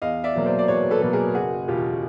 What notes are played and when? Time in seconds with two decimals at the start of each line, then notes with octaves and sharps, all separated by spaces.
0.02 E2 D#5 F5
0.24 D5 E5
0.35 B2 F#3 A#3
0.46 C5 D5
0.59 D5
0.68 E2 B4 C#5
0.90 A4 B4
1.02 B2 F#3 A#3 A4
1.13 G#4 A#4
1.35 F#1 F#4 G#4
1.68 E2 B2 F4 G4